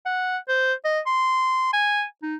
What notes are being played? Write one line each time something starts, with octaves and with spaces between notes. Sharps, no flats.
F#5
C5
D#5
C6
G#5
D#4